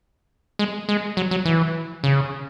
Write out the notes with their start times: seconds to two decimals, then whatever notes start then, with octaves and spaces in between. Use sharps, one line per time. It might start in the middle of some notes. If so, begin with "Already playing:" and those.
0.59 G#3
0.89 G#3
1.17 F#3
1.31 F#3
1.45 E3
2.04 C#3